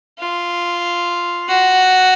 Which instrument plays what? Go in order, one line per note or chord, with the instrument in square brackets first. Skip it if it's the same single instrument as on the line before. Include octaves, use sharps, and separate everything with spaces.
[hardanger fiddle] F4
F#4